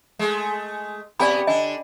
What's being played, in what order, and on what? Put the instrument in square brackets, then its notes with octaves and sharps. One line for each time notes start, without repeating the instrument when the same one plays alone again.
[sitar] G#3 A3
[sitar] C3 B3 G4 [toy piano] D5 G#5 B5
[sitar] D3 D4 [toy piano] D#5 G#5